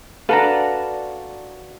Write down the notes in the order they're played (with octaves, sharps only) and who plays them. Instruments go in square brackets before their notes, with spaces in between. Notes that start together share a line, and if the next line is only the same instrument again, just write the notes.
[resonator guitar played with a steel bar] D4 F#4 B4 [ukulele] A4 [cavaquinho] F5 A5 A#5